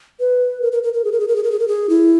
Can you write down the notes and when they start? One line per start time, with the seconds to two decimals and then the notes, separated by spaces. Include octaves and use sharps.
0.20 B4
0.62 A#4
0.72 A#4
0.83 A#4
0.94 A#4
1.04 G#4
1.12 A#4
1.20 G#4
1.28 A#4
1.36 G#4
1.44 A#4
1.52 G#4
1.59 A#4
1.68 G#4
1.89 E4